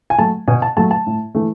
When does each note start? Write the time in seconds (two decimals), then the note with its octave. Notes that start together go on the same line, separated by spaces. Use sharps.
0.10 G#5
0.18 F#3 A3 A5
0.48 B2 G#5
0.62 A5
0.77 F#3 A3 A5
0.91 A5
1.07 A2
1.35 E3 A3